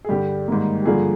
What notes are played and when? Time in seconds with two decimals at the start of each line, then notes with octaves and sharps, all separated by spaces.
0.05 G#4
0.09 G2 D3 G3 G4
0.48 G#2 D#3 G3 A#3
0.82 G4
0.86 G2 D3 F3 A#3 G#4